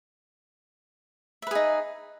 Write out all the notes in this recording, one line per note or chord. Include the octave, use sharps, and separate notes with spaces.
D#4 G#4 B4 E5